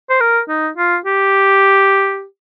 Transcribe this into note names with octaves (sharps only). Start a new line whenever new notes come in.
C5
A#4
D#4
F4
G4